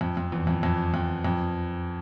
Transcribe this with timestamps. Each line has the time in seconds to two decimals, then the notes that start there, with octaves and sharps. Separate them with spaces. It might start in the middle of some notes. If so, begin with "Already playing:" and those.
0.01 F2
0.17 F2
0.32 E2
0.47 F2
0.63 F2
0.94 F2
1.25 F2